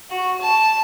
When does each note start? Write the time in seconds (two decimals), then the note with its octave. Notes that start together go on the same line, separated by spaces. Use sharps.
0.10 F#4
0.41 A5